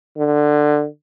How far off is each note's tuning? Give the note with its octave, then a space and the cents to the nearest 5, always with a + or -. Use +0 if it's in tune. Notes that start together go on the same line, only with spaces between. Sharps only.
D3 +15